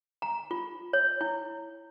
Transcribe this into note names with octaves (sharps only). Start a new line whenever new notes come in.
A#5
F4
C#5
E4